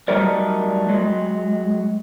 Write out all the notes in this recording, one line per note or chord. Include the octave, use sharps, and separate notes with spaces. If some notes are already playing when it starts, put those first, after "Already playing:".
F#3 G3 A3 D#4 A#4 D5
F#3 G#3